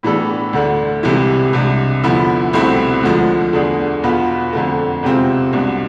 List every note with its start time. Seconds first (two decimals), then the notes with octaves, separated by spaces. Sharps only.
0.03 A2 E3 B3 D4 A4
0.53 D2 D3 A3 D4
1.03 C2 C3 E3 G#3
1.53 C2 C3 G#3 D4
2.03 E2 D3 F3 B3 E4
2.53 C2 B2 A3 C4 E4
3.03 D2 D3 F3 G#3
3.53 E2 D3 A3 D4 G#4
4.03 E2 B2 B3 F4
4.53 F2 D3 A3
5.03 E2 C3 G#3 C4 F4
5.53 C2 B2 G#3 D4